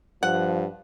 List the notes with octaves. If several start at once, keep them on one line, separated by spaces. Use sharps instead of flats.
G2 F3 F#5